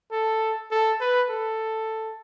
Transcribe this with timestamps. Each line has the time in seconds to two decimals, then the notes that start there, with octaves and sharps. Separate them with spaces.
0.12 A4
0.71 A4
1.01 B4
1.29 A4